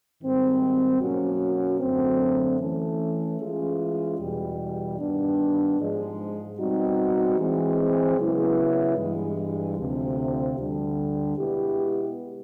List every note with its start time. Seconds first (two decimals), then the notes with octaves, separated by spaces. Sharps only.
0.21 G#2 D#3 G3 C4
1.00 B2 F#3 A#3 C#4 F#4
1.80 F#2 D3 F#3 A3 C4
2.60 E3 A3 C#4
3.40 E3 G#3 C#4 F4 G#4
4.19 E2 B2 G3
4.99 G2 D#3 G3 B3 D4
5.79 G#2 F3 G#3
6.58 B2 G3 C4 D#4 F#4
7.38 E3 G#3 C4
8.18 C#3 F#3 B3 E4 G#4
8.97 G2 E3 G#3
9.77 D2 C3 F3
10.57 D2 D3 G3
11.36 B2 G#3 B3 E4 G4